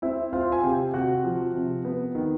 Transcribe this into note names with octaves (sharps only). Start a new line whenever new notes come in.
C4 E4 E5
C4 F4 F5
G#5
C3 G4 G5
C3 F#4 F#5
F3
C3
B3
D#3